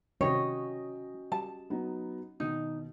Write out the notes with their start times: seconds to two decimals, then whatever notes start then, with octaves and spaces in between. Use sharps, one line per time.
0.21 C3 D#3 G3 C#4 F#4 C#5 D#5 G5
1.32 G3 A5
1.70 F#3 B3 D#4
2.40 B2 D#3 D#4